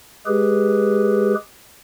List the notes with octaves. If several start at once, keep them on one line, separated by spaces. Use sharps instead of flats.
G#3 G4 G#4 B4